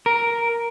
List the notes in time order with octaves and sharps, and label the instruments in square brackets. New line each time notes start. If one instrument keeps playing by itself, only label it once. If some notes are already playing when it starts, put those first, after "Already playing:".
[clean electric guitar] A#4